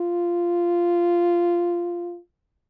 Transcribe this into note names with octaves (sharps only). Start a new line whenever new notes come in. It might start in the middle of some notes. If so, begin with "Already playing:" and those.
Already playing: F4